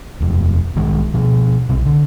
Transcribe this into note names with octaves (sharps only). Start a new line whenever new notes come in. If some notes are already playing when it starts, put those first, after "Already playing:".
D#1 F2
B1 D#3 G#3
B2 F3
B1 C3
D3